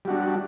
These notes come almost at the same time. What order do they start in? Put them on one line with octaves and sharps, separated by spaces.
G3 F#4 D4